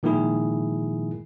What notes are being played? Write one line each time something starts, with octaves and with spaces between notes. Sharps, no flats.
A#2 D#3 F3 G#3 E4 G#4